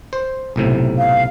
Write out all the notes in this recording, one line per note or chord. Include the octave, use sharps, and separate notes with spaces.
C5
B1 A2 C3
F5